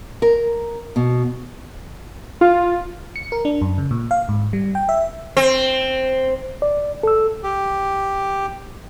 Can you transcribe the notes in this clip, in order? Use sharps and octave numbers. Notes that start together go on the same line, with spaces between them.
A#4
B2
F4
C#7
A#4
D4
F#2
C#3
A#2
F5
G#2
G3
G5
E5
C4
D5
A4 E6
G4